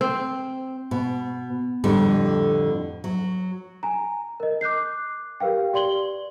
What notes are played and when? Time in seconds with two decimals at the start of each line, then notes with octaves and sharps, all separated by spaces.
0.01 C4
0.91 B2
1.84 F2 A2 D3 G3
3.04 F#3
3.83 G#5 A#5
4.40 A#4 D#5
4.61 D6 F#6 G6 C7
5.40 G4 A#4 B4 F5 G5
5.73 G4 D5 C6 F#7 G7